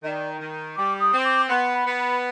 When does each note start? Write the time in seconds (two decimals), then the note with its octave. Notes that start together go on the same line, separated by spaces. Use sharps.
0.03 D#3 D#5
0.07 D5
0.39 D#3
0.77 G3 D6
1.00 D#6
1.12 C4
1.24 D6
1.49 B3 C6
1.73 B5
1.86 B3
1.99 B5